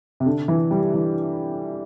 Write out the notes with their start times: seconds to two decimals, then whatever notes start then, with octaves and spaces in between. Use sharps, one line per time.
0.20 C3
0.26 D3
0.48 E3
0.71 G3
0.94 E3